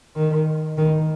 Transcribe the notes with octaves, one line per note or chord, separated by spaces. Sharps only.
D#3
D#3